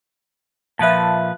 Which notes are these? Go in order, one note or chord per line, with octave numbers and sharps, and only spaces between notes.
A#2 F3 B4 E5 A5